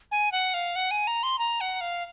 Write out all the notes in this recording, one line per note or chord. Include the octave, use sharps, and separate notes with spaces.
G#5
F#5
F5
F#5
G#5
A#5
C6
A#5
F#5
F5